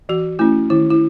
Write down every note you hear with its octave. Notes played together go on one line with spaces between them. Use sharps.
E3 F#4
A3 C#4 E4
D#3 E4
E4